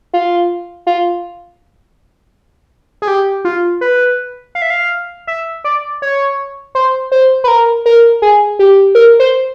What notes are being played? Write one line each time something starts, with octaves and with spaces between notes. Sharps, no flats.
F4
F4
G#4
G4
F4
B4
F5
E5
F5
E5
D5
C#5
C5
C5
B4
A#4
A#4
G#4
G4
A#4
C5